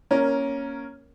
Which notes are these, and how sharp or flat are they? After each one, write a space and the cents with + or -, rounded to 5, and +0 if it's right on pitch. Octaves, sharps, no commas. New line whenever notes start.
A#3 +15 C#4 +0 A#4 +0